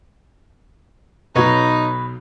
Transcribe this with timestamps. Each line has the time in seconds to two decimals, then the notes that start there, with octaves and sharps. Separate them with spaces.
1.35 B1 B2 D#4 B4 C#5 D#5